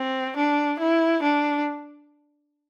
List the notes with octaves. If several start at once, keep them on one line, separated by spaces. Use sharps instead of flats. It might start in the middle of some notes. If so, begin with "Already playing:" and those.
Already playing: C4
D4
E4
D4